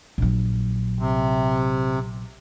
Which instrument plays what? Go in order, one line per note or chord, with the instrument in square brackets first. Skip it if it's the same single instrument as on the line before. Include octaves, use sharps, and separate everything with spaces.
[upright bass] A#1 F#3
[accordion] C3